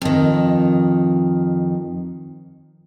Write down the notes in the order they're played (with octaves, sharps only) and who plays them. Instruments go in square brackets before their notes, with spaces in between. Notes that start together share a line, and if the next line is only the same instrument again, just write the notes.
[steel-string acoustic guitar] F2 D#3